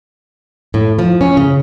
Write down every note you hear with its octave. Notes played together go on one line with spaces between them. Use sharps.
A2
F3
C#4
C#3